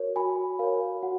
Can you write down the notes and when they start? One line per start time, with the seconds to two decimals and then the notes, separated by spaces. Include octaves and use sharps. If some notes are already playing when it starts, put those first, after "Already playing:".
Already playing: F#4 A#4 C#5
0.16 F#4 G#5 B5
0.59 A#4 C#5 F5
1.03 F#4 F#5